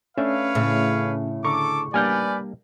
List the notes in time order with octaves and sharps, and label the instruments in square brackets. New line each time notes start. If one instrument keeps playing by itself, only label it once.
[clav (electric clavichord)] A3 D4 E5 [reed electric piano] C#4 [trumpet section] B4 C#5 F5
[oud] A2 C#3
[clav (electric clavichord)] D3 A#5 [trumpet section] A4 D6 [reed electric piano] C#6
[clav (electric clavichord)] G3 A#3 D4 [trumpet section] B4 D5 [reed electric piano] G#5 F6 G6